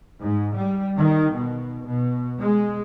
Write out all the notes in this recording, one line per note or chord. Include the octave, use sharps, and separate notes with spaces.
G#2
G3
D#3
B2
B2
G#3